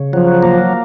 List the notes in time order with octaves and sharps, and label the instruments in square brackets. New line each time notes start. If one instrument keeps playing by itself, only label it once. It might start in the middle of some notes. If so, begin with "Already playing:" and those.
Already playing: [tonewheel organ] C#3
[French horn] F3 [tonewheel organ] F#3
[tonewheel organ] A#3